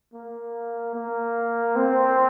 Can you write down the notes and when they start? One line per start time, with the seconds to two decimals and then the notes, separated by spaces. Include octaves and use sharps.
0.14 A#3
0.95 A#3
1.76 C4